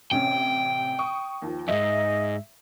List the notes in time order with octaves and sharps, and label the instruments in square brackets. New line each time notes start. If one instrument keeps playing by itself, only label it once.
[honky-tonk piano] A1 C3 C#4 [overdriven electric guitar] G5
[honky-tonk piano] C#6 D#6
D#2 F3
[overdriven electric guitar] F2 G#2 [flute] D#5 [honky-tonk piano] E5